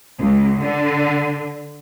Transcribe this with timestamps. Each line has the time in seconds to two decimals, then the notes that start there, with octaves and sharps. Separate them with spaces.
0.19 C#2
0.60 D3